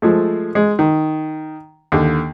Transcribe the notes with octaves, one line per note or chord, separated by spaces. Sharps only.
F3 G#3 A3
G#3
D#3
D#2 D3